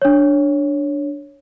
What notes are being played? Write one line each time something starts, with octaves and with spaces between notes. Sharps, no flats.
D4 C#5